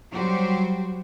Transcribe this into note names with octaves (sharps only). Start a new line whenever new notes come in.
F#3 G3 F#4 G4 C5